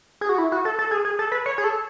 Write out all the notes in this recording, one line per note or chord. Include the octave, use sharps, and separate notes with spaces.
G#4
F#4
E4
F#4
A4
A4
G#4
G#4
A4
B4
C#5
G#4
A4